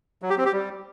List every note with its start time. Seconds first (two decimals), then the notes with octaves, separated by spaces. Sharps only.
0.22 F#3
0.30 G4
0.38 C4
0.45 G4
0.53 G3